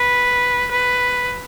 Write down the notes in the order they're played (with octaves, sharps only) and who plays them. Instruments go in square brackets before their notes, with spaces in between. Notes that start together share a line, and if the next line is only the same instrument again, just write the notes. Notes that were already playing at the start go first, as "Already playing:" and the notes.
Already playing: [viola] B4
B4